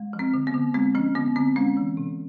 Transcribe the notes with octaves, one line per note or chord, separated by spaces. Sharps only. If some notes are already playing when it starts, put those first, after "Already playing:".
Already playing: G#3
F3
C4
D3
B3
D3
G#3 C4
F3 C#4
D3 B3
D3 C4
G#3 C#4
E3
C3